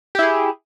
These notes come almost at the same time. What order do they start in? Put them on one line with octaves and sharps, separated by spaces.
G4 E4 G#4